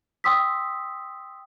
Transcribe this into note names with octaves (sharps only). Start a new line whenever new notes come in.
G5 C6 D#6 E6 B6